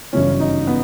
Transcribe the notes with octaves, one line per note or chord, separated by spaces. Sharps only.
G1 F#2 C#3 E3 C#4
D#4
B3